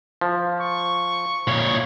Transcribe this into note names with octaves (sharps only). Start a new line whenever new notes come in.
F3
C#6
A#2 C#5